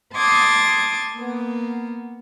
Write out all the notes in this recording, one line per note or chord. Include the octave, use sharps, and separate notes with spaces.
A5 C6 D6 D#6 G#6 A6
A#3 B3